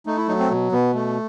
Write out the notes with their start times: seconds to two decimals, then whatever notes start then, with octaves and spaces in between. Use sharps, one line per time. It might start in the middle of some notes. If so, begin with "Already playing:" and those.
0.06 A3 D#4
0.17 E4
0.28 F#3 D#4
0.39 C4
0.50 B2
0.72 B2 B3
0.94 A3